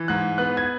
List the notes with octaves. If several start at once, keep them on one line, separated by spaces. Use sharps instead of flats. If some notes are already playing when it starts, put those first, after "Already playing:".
Already playing: E3
G#2 F#6
B3 F#6
G#6